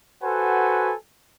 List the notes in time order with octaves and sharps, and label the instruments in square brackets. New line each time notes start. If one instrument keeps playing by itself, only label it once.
[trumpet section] F#4 A4 B4 C5 F#5 G#5